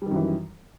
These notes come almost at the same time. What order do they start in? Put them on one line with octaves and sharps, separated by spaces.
G3 D#3 F#2 E3